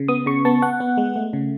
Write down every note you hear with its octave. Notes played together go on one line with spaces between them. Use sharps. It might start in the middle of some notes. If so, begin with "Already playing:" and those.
Already playing: C#3
B3 D#6
C#3 C#6
B3 A5
B3 F#5
B3
G#3
A3
C#3